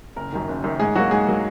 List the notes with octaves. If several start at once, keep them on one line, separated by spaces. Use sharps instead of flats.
F#1 A#4
F#2 D#3
F#1
F#2 D#3
G#2 G#4
F#3 A#3 F#4
G#2 G#4
F#3 A#3